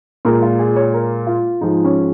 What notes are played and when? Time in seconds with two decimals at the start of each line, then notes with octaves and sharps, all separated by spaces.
0.25 A#2 G#3 A#4
0.42 F4
0.59 G#4
0.76 C#5
0.94 A#4
1.27 F4
1.61 G#2 F3 G#3 D#4
1.84 C#4